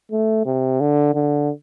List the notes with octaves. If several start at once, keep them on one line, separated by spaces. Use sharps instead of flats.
A3
C3
D3
D3